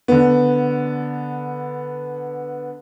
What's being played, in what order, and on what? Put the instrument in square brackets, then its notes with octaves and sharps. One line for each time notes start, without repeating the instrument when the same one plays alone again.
[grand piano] D3 B3